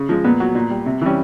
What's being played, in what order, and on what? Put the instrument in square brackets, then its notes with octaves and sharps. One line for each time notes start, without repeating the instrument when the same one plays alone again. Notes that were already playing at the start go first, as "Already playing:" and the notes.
Already playing: [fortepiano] C#3
F3 G#3
A#2 B3
F#3
A#2
G3
C3
E3 G3 C#4